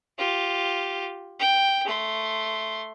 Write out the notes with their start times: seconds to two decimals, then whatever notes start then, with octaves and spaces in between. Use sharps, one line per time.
0.18 F4 G4
1.40 G5
1.85 A3 C6